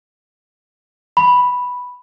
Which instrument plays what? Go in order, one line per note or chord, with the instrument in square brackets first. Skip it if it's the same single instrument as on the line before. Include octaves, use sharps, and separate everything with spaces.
[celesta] B5